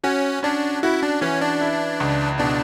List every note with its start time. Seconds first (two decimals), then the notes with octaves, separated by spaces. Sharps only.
0.04 C#4 F#4
0.43 C#4 D4
0.83 E4 F#4
1.03 D4
1.21 E3 C#4
1.41 D4
1.61 E4
2.00 C#2
2.39 B2 D4